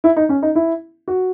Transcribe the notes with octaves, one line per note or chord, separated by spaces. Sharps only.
E4
D#4
C#4
D#4
E4
F#4